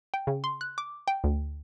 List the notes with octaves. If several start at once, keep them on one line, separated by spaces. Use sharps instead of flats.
G5
C#3
C6
F#6
D6
G5
D2